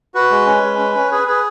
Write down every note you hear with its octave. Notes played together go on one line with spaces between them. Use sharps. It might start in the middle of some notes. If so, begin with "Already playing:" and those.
F#4 B4
G#3
C#4
G#3
C#4
C#4
G#4 B4
G#4 B4